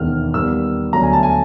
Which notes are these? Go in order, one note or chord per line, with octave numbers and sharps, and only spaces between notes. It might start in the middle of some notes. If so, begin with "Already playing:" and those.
Already playing: E1 D#2 D#3 G#3 B3 F6
D#2 D#3 G3 B3 E6
D2 D3 F#3 B3 A#5
G#5
A5
G#5